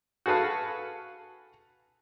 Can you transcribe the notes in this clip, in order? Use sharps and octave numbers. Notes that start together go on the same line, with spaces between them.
F#4 G#4 A4 B4 F5